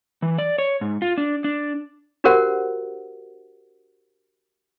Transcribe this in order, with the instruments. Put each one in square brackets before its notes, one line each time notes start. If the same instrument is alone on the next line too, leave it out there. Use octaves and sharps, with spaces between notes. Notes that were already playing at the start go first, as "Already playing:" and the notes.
[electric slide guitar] E3
D5
C#5
G#2
F4
D4
D4
[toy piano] D4 F#4 G4 A#4 C5 F#5